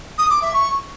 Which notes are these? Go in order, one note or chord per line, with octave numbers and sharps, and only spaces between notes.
D#6
D6
E5
C#6